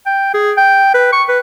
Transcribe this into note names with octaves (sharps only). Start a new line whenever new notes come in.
G5
G#4
G5
B4
C#6
B4